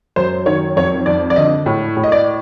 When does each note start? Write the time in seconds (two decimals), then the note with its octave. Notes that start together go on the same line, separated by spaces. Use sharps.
0.16 F#2 C5
0.46 D#3 C#5
0.76 F2 C#5
1.06 F2 D5
1.30 D5
1.36 D3 D#5
1.66 A2
1.97 A2
2.04 D#5
2.12 D5